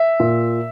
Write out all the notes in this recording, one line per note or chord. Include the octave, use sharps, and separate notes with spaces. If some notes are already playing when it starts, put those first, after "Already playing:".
Already playing: E5
A#2